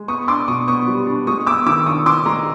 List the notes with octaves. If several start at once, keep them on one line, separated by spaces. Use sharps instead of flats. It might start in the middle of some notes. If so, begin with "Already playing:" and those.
Already playing: G#3
B3 C#6 D#6
D4 C6 D6
B2 C#6 D#6
B3 C#6 D#6
G3
D4
G#3 C#6 D#6
B3 D6 E6
D#3 D6 E6
D4 C#6 D#6
D#3 C6 D6
G#3 A#5 C6